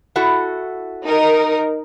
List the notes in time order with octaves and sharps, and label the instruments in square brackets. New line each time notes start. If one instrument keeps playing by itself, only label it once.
[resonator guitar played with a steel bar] E4 F#4 A4
[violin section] D#4 A#4